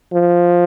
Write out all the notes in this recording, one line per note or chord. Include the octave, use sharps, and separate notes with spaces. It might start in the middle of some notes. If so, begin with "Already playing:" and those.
F3